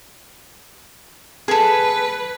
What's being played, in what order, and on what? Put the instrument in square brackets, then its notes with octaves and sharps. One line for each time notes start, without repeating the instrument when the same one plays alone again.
[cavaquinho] G#4 A4 [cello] B4